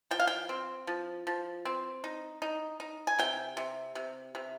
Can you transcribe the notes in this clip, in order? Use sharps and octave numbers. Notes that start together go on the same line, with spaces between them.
F3 G5
F5
G5
C4
F3
F3
C4
D#4
D#4
D#4
G#5
C3 G5
C3
C3
C3